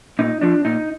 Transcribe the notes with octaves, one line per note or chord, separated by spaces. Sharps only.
A#2 D#4
F3 D4
A#2 D#4